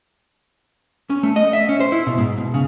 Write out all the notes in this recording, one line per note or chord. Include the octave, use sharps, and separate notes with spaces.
C#4
A3
D#5
E5
C#4
C5
E4
B2
G#2
B2
C#3